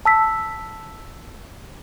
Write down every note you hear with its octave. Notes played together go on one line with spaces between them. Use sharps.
A5 E6 B6